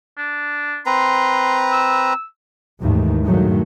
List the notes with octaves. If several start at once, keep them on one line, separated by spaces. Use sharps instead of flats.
D4
C4 B4 A#5 C6
E6
D#2 G#2 D#3 E3 A3
G2 A#2 D#3 F#3 G#3 A3